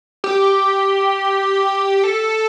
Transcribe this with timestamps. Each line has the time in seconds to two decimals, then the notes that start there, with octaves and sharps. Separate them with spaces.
0.24 G4
2.04 A4